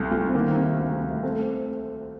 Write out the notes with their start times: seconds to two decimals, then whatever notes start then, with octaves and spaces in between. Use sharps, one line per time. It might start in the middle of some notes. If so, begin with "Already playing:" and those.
Already playing: C2 A3
0.12 C2
0.29 C4
0.34 D#3 A#3
0.57 C3
0.78 D2
1.00 D2
1.23 A3 C4